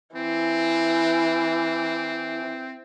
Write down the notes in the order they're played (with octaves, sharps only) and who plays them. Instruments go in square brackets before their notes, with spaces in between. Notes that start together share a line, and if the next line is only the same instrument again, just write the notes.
[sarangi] E3 [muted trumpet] C4